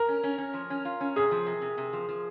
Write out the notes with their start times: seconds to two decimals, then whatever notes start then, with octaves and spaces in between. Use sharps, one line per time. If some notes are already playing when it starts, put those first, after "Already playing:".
Already playing: A#4
0.08 C#4
0.23 C#4
0.38 C#4
0.54 F3
0.70 C#4
0.85 F4
1.01 C#4
1.16 C3 G#4
1.31 F3
1.46 C3
1.61 C3
1.77 C3
1.93 F3
2.09 F3